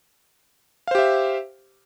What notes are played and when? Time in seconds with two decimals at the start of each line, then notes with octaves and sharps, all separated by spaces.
0.87 F5
0.91 C5
0.95 G4
0.98 E5